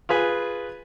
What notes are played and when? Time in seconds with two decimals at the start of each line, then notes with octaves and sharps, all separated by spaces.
0.09 F4 G#4 B4 G#5